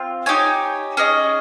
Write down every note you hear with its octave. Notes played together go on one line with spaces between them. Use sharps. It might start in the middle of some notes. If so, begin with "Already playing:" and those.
Already playing: C4 F4 F5
D#4 G4 C#5 G#5
C#4 G#4 D#5